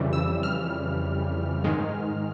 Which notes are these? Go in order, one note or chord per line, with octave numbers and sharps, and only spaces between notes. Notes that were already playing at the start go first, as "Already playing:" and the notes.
Already playing: F2 C#3 E3 G3
E6
F6
G#2 D#3 G#3